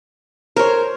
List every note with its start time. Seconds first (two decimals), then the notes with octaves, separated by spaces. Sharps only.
0.56 A#4 C5 C#5